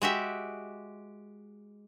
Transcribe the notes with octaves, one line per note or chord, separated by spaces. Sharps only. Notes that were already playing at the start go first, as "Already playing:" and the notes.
G#3 F#4 G4 E5